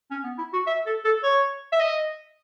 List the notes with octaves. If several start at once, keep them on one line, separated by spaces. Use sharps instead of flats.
C#4
B3
E4
F#4
E5
A4
A4
C#5
E5
D#5